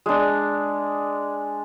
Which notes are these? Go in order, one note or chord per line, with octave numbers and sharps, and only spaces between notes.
G#3 D4